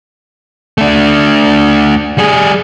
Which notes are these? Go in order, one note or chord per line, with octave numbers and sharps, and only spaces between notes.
A3 D4
G3 G#4